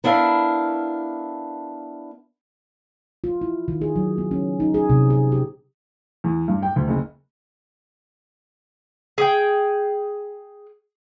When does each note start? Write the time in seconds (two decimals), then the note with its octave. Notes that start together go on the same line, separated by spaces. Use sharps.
0.04 B3 D4 E4 A#4 F5
3.24 F4
3.41 E4
3.68 D#3
3.82 G#4
3.96 F#3
4.18 B3
4.31 C#4
4.60 D#4
4.74 G#4
4.90 C3
5.10 G#4
5.32 G4
6.24 E2
6.48 G2
6.63 G5
6.76 D2
6.88 F#1
9.18 G#4 G5